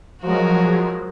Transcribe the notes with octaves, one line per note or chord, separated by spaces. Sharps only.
F3 F#3 G#3 F#4 A#4